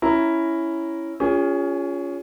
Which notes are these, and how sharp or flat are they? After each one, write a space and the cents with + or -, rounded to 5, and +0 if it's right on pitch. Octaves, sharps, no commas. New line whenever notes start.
C#4 +0 E4 +0 A#5 +0
C#4 +20 F4 +0 G#4 -30